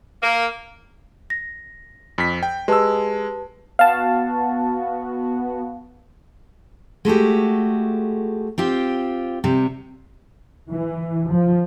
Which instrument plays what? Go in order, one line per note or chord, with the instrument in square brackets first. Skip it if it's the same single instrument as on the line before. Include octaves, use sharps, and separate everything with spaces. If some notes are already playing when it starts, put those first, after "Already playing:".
[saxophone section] A#3
[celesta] A#6
[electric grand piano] F2 B6
G5
[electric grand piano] G#3 E6 [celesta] G4 B4 A5
[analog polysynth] B3 F#4 [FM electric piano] F5 A5
[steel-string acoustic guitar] G#3 A3 F#4 G4
C4 F4 G4
C3 G3
[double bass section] E3
F3